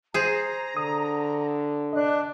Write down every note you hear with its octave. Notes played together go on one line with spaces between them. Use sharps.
G#4 C5 A#5
D3 D#6
D4 D5 D#5 F#6